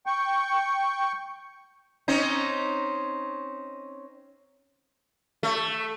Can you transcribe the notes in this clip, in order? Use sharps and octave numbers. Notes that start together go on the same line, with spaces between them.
G5 C#6
C4 C#4 D#4
A3